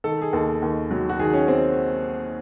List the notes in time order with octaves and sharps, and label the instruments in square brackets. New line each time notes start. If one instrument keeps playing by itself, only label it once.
[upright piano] D#3 A4
G#4
D#2 A4
D#2
F#3
F#4
D#3 G#4
C#4
C4